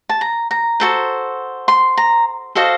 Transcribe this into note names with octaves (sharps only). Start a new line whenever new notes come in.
A5
A#5
A#5
F#4 A4 C5
C6
A#5
F#4 A4 C5 D#5 F5